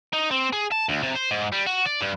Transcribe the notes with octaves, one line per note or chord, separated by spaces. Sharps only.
D#4
C4
G#4
A5
D2
C3
C5
G#2
G3
F#4
D5
G2